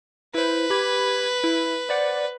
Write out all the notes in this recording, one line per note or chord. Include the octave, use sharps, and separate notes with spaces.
E4 B4 C5
G4 B5 G#6
E4
C5 D5 F#5